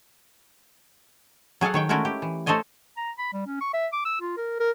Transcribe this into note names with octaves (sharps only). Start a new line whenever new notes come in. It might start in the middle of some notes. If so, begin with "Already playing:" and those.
F#3 G#4 A4 F5 F#5
D#3 C#5 G5
G#3 A3 C#4 E4 F#4 A#4
G4
E3
A3 A4 C5 C#5 D#5 G#5
A#5
B5
G3
C#4
C#6
E5
D6
E6
F4
A#4
A#4